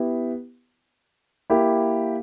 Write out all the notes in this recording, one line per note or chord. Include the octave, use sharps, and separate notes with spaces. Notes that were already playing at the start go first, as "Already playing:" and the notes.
Already playing: B3 E4 G4
A#3 E4 G4